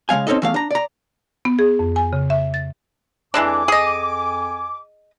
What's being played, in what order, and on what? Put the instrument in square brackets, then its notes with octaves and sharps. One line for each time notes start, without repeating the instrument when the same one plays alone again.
[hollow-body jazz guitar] C#3 G#3 A3 F5 G#5
C4 C#4 D#4 A4 D#5
E2 A3 F5
D4 A#5
D5 A#5
[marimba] B3
G#4
F2
G#5
C#3
E5
A6
[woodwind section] F2 G#5 D6 [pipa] E3 G#3 D4
[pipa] G#4 D#5